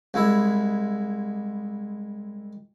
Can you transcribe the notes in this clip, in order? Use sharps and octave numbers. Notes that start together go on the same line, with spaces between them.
C2 G#3 E4 E5